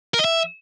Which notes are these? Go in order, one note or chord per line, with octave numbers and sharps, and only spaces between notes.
A#4
D#5
E5